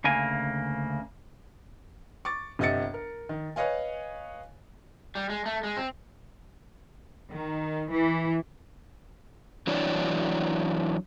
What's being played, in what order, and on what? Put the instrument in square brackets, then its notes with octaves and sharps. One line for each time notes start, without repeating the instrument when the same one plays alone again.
[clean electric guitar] D2 C#3 A#3 G#5
[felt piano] C#6 D6 A6
G1 C3 D#5 E5 A6 C#7
A#4
D#3
B4 C#5 D#5 F5 G#5
[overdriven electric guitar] G3
G#3
A3
G#3
C4
[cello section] D#3
E3
[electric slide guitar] E3 F#3 D4 E4 C#5 D5